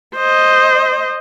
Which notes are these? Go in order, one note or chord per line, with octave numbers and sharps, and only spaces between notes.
C5 D#5